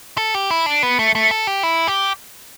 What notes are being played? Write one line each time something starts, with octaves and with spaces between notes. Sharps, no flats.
A4
G4
E4
D4
B3
A3
A3
A4
G4
E4
G4